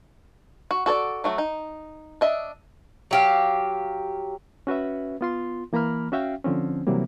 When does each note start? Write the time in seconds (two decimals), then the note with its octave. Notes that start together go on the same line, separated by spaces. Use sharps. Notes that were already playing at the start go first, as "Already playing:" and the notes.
0.71 F#4
0.86 F#4 A4 C#5 D5
1.24 F#3 A3 F#4
1.38 D#4
2.21 D4 D#5 E5
3.11 F#3 G4 F5
4.67 C#4 F#4 B4 E5
5.21 B3 F4 C6
5.73 E3 A#3 A#5 B5 F6
6.12 C#4 F#4 E5 F5 G5
6.44 D3 F3 C4 C#4
6.87 C3 E3 F#3 G3 A#3